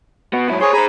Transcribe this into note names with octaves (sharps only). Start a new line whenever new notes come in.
B3 F#4
G#2 F#3 E4
G#4 A#4 C5 C#5
G#4 C5 A#5 B5